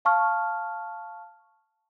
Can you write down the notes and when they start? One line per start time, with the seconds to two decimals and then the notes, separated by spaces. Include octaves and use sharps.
0.05 F5 A5 C#6 F6